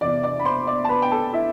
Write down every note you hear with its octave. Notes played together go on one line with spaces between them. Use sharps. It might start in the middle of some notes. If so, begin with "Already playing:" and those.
E2 C3 E3 D5 D6
D5 D6
B5
C5 C6
D5 D6
A5
B4 B5
G5
A4 A5
E4 E5